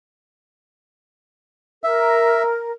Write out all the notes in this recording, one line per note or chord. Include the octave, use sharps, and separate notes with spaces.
A#4 E5